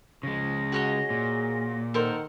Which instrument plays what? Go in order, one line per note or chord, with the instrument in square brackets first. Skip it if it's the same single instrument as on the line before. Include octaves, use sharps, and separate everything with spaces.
[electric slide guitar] C#3 G#3 [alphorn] F3 [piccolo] A#6
[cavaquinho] F#4 C#5 D#5 [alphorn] G#4
[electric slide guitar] A#2
[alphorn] D#3 [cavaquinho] A4 A#4 C5 [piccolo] F#5